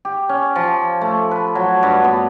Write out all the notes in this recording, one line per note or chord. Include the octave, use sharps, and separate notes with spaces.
G4
C#4
F3
A3
B4
F#3
G2
B3